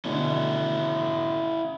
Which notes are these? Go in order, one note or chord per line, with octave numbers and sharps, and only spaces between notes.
B2 D3 A3 C#4 E4